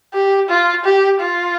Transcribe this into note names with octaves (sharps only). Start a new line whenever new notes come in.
G4
F4
G4
F4